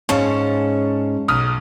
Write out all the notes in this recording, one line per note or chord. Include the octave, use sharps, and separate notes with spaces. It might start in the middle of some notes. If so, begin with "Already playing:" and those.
G#2 C#4 F5 A5 C#6
B1 D#6 F6